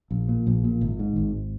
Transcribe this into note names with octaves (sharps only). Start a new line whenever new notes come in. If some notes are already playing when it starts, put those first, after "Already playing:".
A#1
A#2
A#1
A#2
G#1
G#2
G#1